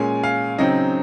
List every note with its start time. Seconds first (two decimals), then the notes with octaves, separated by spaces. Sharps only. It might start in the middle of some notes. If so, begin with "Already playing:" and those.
Already playing: A#2 G#3 C#4 G#5
0.23 F5
0.58 C#3 F#3 C4 D#4 D#5